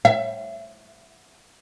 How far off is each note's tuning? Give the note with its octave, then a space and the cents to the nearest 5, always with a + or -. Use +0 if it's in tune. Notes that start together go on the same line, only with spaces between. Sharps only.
E5 +25